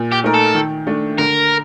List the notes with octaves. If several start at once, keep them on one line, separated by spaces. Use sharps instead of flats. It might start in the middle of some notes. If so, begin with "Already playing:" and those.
Already playing: A#2
G4
A3 D#4 A#4
A4
D#3
A3 D4
D3 A#4